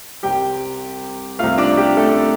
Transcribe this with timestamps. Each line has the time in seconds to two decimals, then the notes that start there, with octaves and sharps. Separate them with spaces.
0.23 C2 C3 G3 G4 G5
1.39 C2 C3 A3 F4 F5
1.58 D4 D5
1.77 G4
1.97 A3 A4